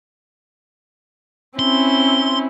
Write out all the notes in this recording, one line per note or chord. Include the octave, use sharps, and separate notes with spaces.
C4 C#4 E4 C6